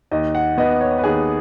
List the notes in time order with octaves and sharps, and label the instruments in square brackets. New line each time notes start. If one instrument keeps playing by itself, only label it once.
[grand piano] D#2 D#5
F#5
B3 D#5
C#5
B4
D#2 G#4